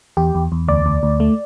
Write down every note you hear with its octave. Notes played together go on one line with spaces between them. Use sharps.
E2 G4
E2
E2
D2 D5
D2
D2
A3